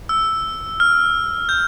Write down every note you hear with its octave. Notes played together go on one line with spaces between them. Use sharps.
E6
F6
G6